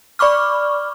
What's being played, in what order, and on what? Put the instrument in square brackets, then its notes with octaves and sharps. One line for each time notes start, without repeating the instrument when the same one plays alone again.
[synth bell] D5 B5 C#6 D6 F6